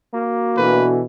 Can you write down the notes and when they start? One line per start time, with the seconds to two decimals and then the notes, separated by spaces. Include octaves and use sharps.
0.14 A#3 F#4
0.57 B2 D3 E3 B4